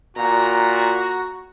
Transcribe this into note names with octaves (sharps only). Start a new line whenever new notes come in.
A#2 F#4 A#5